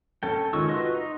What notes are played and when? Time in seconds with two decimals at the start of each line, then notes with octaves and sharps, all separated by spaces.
0.23 C#4 A4 G5
0.53 D#3 G#3 F4 C#6 E6
0.69 F4 F#4 B4 D#5 C6
0.94 D#4